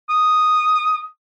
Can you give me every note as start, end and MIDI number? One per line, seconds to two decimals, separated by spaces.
0.09 1.04 87